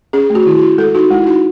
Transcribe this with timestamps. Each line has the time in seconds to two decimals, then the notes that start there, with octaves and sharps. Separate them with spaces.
0.13 C#4 G#4
0.30 A3
0.35 F#4
0.46 D#3 E4
0.57 F#4
0.63 E4
0.78 G#3 A4
0.95 D#4 F#4
1.11 G#3 E4
1.21 E4
1.27 D#4 F#4